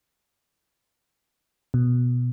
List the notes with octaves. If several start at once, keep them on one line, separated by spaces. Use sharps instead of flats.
B2